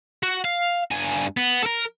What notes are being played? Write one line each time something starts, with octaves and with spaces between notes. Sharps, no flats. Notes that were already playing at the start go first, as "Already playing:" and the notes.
F#4
F5
G2 G#5
B3
A4 A#4